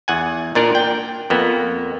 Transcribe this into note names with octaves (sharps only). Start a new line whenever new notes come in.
E2 F#5 G#5
A#2 D4 A#4 D5
G5
F2 A#3 B3